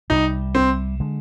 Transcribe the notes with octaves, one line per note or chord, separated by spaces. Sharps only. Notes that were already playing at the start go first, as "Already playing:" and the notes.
C2 C3 D#3 G3 D#4
C4
D3 G#3